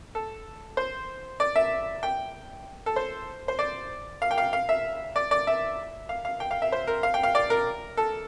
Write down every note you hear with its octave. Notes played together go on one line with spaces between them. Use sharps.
A4
C5
D5
E5
G5
A4
C5
C5
D5
F5
G5
F5
F5
E5
D5
D5
E5
F5
F5
G5
F5
E5
C5
A#4
F5
G5
F5
D5
A#4
A4